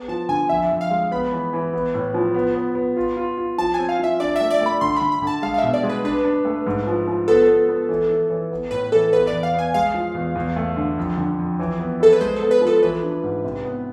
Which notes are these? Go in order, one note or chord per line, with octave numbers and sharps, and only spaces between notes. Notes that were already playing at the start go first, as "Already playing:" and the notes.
Already playing: B3
F3 A5
D3 G#5
F2 E5
F2
F5
G#3
B3 B5
E3
E3
B3
A2
F3
B3
B3
B3
F4
F4
F4
F3 A5
C4 G#5
F5
F3 E5
D4 D5
A3 E5
D5
A3
B5
D3 C6
D3 B5
B5
D3 A5
G#3 F5
F5
B2 E5
D5
G#3
B4
D4 B4
D4
A3
G#2
F3
F3
B3 A4
B3
B3
E3
E3
E3
B3
A2 B4
E3 A4
B3 B4
D5
E2
F5
B3 G#5
G#3 F5
F3
E2
E2
A3
D3
F2
D3
F2
E3
B3
E4 A4
B4
G#3 C5
B3 A4
B4
F3
A4
E3 B4
D4
G#2
C3
B3